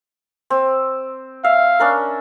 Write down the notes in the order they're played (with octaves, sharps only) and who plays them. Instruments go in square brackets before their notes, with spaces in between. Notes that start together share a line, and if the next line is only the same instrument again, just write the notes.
[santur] C4
[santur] E5 [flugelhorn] F5
[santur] C#4 D4 A#4